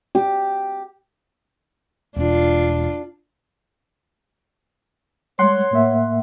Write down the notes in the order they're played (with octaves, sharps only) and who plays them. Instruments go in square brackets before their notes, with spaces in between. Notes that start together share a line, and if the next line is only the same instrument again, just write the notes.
[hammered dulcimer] G4
[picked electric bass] E1 [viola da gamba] D4 F4
[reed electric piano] G3 G#3 [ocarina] C#5 [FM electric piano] F#5 C6
[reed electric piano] A2 A#3 E5